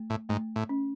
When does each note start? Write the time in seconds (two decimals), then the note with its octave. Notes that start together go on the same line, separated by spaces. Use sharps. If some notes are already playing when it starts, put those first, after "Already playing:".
Already playing: A3
0.10 A2
0.29 G#2 A3
0.56 A2
0.69 C#4